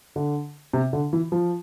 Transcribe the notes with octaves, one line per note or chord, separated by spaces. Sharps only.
D3
C3
D3
E3
F3